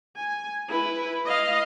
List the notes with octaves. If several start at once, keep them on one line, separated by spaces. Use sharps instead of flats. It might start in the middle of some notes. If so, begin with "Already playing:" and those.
G#5
E4 B4
D#5 F5